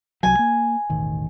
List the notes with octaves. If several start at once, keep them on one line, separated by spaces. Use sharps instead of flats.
C2 F#3 G#5
A#3
E1 A1 D#3